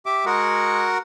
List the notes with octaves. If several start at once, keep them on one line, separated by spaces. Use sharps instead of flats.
G4 E5 D6
G#3 F#4 A#4 F#5